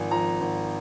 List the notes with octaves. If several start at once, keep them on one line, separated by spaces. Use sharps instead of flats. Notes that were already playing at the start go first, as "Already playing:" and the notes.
Already playing: G#1 F3 G#5
F3 A#5
G#1